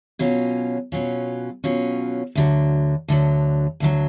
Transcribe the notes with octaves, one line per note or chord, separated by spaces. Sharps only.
B2 F#3 C#4 F4
B2 F#3 C#4 F4
B2 F#3 C#4 F4
D2 D3 F#3
D2 D3 F#3
D2 D3 F#3